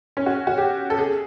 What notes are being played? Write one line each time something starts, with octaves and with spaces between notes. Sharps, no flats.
C#4
F#4
F#4
G4
A4
G#4